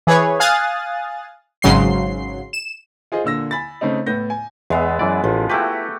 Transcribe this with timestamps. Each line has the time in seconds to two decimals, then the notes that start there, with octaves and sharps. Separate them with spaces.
0.07 E3 G#4 B4 C#5
0.40 F5 G#5 D#6 F#6 A6
1.62 G#1 G#2 C#3 F#3 C6 C7
2.53 E7
3.12 F4 G#4 C5 D#5
3.24 A#2 D3 E6 A#6
3.51 G#5 B5 A6
3.81 C#3 A3 C4 D#4
4.06 A2 B3 G6 A#6
4.30 G#5
4.70 E2 G#3 B3 E5 F5
4.99 F#2 E3 D5
5.24 A1 F3
5.49 A3 E4 F#4 G4 B4